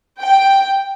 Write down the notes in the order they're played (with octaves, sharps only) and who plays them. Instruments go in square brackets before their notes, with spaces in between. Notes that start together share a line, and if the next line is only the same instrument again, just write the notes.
[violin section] G5